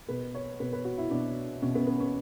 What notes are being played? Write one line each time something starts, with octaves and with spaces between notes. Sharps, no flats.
B2 B4
C#5
B2 B4
B4
F#4
E4
B2 D4
B2 C#4
B3
B3
C#4